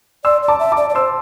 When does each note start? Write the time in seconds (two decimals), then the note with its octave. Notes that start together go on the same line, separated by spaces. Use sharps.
0.25 D5 C6 E6
0.43 D5
0.48 A5 D6
0.60 E5
0.72 A5 D6
0.77 D5
0.90 D5
0.95 C5 C6 E6